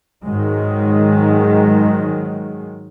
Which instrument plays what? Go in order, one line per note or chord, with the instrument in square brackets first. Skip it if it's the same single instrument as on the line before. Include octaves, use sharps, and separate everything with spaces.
[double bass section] G#2 D#3 F#3 G#3